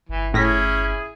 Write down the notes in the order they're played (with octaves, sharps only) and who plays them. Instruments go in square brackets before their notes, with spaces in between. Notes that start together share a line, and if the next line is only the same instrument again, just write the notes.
[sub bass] G1 [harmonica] E3
[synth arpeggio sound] A2 A#6 B6 [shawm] C#4 [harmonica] E4 G#4